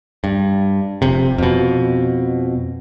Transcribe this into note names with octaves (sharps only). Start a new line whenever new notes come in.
G2
F1 C3
F2 B2